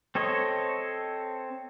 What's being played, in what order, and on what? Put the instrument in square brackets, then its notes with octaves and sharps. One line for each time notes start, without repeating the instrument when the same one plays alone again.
[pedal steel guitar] C4 A4 C#5 D#5